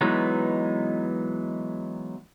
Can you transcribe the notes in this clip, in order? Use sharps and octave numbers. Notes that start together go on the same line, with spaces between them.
E3 F#3 G#3 B3 D#4